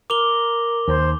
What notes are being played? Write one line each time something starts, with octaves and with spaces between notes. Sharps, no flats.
A#4 D6 F7 G7
D#2 C5